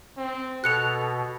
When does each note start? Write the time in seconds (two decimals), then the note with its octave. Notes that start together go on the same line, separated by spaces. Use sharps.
0.17 C4
0.64 B2 A4 F#6 C#7 F7